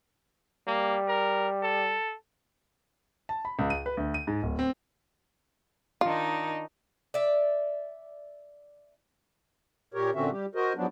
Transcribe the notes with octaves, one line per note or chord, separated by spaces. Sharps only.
G3 A#3
A#4
A4
A5
B5
C#2
D#7
B4
D2
D#7
G#2
D1
C4
D#3 D4 D#4 F4
D5 E5
A#2 G4 A#4 C#5
A#2 D3 C4 C#4 F#4 E5
G3 G4
F#4 A#4 C5 D#5
G#2 F3 F#3 B3 D4